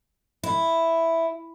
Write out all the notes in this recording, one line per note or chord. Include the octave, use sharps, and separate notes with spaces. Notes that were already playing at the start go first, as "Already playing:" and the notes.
E4